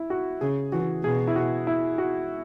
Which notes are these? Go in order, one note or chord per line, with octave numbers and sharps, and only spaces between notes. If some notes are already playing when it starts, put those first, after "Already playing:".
Already playing: E4
F#4
C#3 G#4
E3 F#4
B2 G#4
E4
F#4
E4
F#4